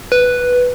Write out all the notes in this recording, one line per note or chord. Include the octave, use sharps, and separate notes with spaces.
B4